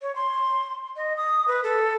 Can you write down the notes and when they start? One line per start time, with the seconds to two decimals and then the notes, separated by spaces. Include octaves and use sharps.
0.02 C#5
0.16 C6
0.96 D#5
1.17 D#6
1.48 B4
1.64 A4